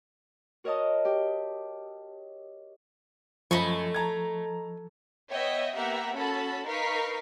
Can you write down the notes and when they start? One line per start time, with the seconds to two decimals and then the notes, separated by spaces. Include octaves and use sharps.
0.64 F#4 A#4 C#5 D#5 A5 D#6
1.05 G4
3.51 F#2 F3 A3 D#5 B5 C#6
3.94 A5 A#5 G#6
5.30 B3 C#5 D#5 E5 G5
5.75 A#3 B3 G4 E5 F#5 A#5
6.15 C#4 F#4 A4 A5 B5
6.66 D#4 A#4 B4 F5 C#6 B6